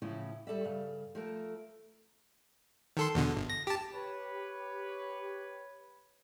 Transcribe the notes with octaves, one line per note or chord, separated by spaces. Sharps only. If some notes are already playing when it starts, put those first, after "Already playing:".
A2 C#3 E3 F3 C#4 E4
G3 A4 D5 E5
G2 C#3 F5
F3 A3 A#4
D#3 A4 C6
E2 B2 D3
G1
A#6
G4 A5
G4 B4 C#5